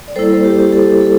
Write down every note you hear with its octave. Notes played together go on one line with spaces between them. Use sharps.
D5
G3 A#3 E4 A4 C5
A4
G4
G4
A4
A4